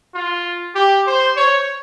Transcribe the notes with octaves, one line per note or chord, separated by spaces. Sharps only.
F4
G4
C5
C#5